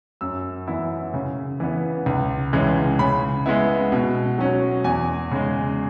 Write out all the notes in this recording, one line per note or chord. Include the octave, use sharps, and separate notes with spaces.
F#2 E6
E3 B3 E4
C#3
E3 B3
C#2
C#3 E3 G#3
C#3 B5
G#3 B3 E4
B2
F#3 C#4
E2 G#5
C#3 G#3